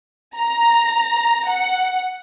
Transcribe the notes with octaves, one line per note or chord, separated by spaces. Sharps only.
A#5
F#5